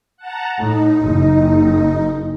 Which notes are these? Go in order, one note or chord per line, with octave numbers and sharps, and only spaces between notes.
F#5 A5 A#5
A2 D#4
F#1